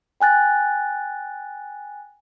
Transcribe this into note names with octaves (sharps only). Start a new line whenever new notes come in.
G5 G#5 F#6 A6